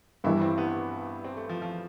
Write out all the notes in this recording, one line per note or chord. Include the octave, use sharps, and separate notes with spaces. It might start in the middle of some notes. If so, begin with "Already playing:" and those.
G2 E3 G3 E4
C4
B3
C4
A3
F3
F3